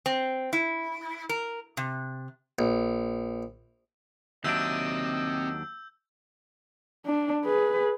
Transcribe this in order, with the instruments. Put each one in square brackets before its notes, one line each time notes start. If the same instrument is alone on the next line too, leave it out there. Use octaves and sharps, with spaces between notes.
[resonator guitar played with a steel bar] C4
E4
A#4
C3
[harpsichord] A#1
[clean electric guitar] D#2 F#3 D4 [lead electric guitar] C4 E5 [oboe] D#5 [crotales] E6 G6
[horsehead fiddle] D4
G#4 B4